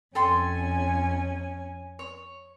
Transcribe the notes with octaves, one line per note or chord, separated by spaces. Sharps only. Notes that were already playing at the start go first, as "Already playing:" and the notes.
F2 C#4 A4 G5 G#5 C6
C#5